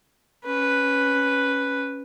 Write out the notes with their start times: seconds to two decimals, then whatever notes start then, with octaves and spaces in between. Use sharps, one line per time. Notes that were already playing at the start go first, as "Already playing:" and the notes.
0.45 C#4 B4